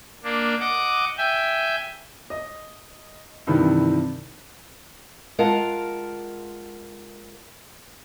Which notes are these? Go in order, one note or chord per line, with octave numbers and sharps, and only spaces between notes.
A#3 D4
D#5 F#5 D6
E5 G5 G#5
D#5
G2 C3 D#3 E3
G#3 F4 A#4 F5 F#5 A5